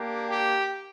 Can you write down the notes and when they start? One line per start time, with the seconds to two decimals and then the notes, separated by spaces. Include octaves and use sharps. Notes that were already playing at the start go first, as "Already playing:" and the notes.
Already playing: A#3 D4 G4
0.30 G4